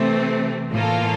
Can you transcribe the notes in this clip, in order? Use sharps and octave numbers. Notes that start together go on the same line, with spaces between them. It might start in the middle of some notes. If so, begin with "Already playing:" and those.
Already playing: C3 E3 A3 C4
A2 E3 A#3 F4 A4